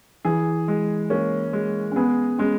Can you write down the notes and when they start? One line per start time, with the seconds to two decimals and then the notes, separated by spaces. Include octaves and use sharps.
0.25 E3 G#4
0.68 G#3
1.10 A#3 C#4
1.53 G#3
1.91 C#4
1.96 B3 G#4
2.38 G#3 C#4